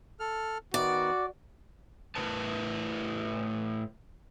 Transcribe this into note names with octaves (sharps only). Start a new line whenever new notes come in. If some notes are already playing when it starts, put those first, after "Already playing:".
A4 F6
D#3 B3 F#4 D5
A2 B3 E4 A#4 B4 A5